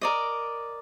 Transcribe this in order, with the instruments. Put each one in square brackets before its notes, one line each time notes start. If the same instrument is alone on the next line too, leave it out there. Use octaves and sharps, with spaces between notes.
[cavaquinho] A#4 D5 D#5